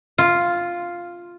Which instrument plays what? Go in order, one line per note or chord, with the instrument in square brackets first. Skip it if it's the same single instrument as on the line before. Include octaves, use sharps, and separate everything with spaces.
[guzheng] F4